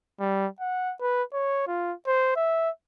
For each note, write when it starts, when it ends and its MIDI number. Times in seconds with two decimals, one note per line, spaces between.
0.20 0.47 55
0.61 0.94 78
1.01 1.23 71
1.33 1.67 73
1.67 1.93 65
2.07 2.32 72
2.36 2.70 76